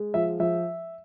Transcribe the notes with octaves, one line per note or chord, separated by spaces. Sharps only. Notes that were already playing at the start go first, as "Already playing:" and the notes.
Already playing: G#3
F3 E5
F3 E5